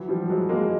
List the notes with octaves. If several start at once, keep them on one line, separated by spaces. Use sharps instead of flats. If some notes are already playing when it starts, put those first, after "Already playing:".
Already playing: E3 F#3
F3 G3
F#3 G#3
G#3 A#3